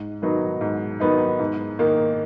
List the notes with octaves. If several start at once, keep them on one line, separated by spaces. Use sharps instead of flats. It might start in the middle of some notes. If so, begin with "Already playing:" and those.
Already playing: G#2
D#3 F#3 B3 D#4
G#2
D#3 F#3 B3 D#4
G#2
D#3 A#3 D#4